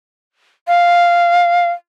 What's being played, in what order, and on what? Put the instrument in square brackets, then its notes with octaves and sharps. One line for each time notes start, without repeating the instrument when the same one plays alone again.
[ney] F5